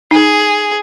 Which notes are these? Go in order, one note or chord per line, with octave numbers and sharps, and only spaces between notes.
D#4 G#4